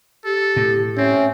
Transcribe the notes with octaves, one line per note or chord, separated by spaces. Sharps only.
G4 A4
A2
C4 C#4 E5